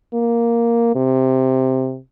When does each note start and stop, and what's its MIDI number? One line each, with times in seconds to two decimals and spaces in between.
0.13 0.93 58
0.95 1.98 48